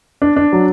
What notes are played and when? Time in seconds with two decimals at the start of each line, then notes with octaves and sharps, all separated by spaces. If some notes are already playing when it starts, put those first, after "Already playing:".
0.22 D4
0.36 D4
0.53 F#3